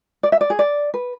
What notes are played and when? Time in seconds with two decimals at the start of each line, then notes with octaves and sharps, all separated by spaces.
0.23 D5
0.32 E5
0.41 D5
0.50 G#4
0.59 D5
0.94 B4